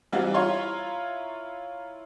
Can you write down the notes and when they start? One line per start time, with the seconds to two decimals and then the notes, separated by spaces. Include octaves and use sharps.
0.12 E3 G3 C4 D#4 F4 F#4
0.34 E4 F4 C#5 A#5 C6